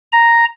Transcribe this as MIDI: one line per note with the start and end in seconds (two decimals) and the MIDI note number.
0.12 0.45 82